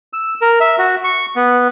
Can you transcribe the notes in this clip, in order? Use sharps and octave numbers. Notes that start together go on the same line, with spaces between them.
E6
A#4
E5
F#4
C#6
B3